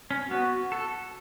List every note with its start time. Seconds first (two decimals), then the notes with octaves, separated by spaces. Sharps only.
0.11 C#4
0.30 B3 F#4
0.72 A4